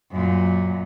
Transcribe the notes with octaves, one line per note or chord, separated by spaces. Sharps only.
F#2 A#2